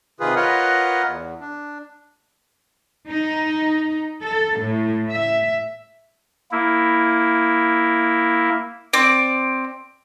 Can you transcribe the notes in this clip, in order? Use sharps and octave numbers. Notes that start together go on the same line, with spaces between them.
C3 D#3 F4 G#4 B4
F4 A#4 B4 C#5 D#5 F#5
E2
D4
D#4
A4
A2
E5
A#3 E4
C4 D5